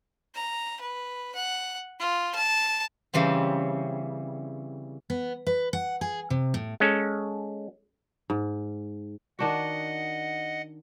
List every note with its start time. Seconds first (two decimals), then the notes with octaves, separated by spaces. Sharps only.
0.35 A#5
0.80 B4
1.35 F#5
1.99 F4
2.35 A5
3.14 C#3 E3 G3 C4
5.10 B3
5.47 B4
5.73 F#5
6.01 G#4
6.30 C3
6.54 A2
6.80 G#3 C#4 A4
8.30 G#2
9.39 D#3 D4 F#4 D#5 F#5